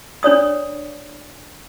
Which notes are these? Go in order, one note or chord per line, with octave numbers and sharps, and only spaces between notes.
D4 C#5 D5 D#6